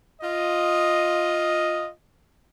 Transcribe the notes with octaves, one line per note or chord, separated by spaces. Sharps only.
F4 D#5